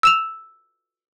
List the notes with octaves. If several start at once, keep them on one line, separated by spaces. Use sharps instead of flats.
E6 E7 F7